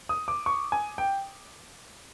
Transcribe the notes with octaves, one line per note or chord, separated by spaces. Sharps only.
D#6
D6
C#6
G#5
G5